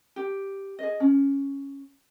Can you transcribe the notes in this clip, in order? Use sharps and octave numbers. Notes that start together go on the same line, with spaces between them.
G4
G#4 D#5
C#4